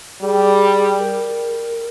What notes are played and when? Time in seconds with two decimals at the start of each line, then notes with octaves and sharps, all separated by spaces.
0.21 G3 G#4
0.99 A#4